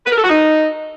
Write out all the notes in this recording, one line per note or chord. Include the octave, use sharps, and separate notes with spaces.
B4
A#4
A4
F#4
D#4